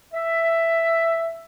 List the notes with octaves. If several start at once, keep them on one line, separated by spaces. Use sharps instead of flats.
E5